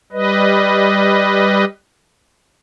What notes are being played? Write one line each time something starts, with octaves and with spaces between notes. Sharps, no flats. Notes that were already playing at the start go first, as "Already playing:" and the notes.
G3 B4 D#5